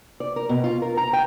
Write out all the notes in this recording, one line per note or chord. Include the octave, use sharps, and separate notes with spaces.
D5
A#4
B2
F4
A#4
A#5
G5